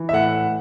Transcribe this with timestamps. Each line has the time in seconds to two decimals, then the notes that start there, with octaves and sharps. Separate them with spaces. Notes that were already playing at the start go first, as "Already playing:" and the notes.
Already playing: E3
0.09 E5
0.13 A2 F#5